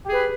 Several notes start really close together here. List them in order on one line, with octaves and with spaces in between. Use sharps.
G4 G#4 B4